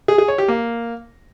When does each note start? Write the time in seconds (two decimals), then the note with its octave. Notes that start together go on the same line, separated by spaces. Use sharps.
0.08 G#4
0.18 G#4
0.28 C#5
0.38 G4
0.48 A#3